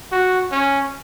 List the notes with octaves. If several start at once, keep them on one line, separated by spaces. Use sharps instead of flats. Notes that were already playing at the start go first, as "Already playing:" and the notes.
F#4
C#4